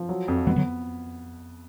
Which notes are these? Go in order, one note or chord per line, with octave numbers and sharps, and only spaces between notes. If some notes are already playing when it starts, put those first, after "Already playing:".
Already playing: F3
F#3
F2
F3 G#3 B3
D3 F#3